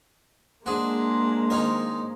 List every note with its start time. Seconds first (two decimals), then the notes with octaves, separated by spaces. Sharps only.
0.66 G#3 A#3 D4 F#4 G#4 C5 D#5 A5
1.50 D#3 F3 C4 D#4 C#5 C#6